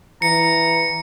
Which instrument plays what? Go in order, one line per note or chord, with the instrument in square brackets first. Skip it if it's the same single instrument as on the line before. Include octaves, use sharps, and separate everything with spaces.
[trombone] E3 [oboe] A#5 [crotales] C#7